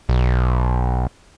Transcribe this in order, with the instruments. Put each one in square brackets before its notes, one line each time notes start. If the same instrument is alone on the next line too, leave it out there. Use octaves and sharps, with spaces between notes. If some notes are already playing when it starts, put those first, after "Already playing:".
[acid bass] B1